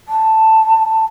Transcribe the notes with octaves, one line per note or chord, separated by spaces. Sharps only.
A5